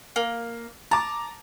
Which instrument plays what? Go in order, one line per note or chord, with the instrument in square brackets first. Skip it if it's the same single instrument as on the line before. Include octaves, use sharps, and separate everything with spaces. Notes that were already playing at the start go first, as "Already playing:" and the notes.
[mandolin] A#3
[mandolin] A5 [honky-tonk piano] A#5 D6